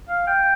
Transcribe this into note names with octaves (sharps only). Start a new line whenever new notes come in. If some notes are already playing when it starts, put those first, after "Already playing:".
F5
G5